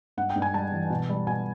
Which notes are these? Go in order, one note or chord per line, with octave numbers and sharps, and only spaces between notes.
G2 F#5
G5
G2
G#5
G3 A5
E3
B2
G3
B2 G#5